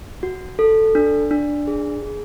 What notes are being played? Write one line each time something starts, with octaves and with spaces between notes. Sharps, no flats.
F#4
A4
D4
D4
G#4
G#4